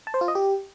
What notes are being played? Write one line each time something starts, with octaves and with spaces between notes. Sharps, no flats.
A5
C5
F4
D#5
G4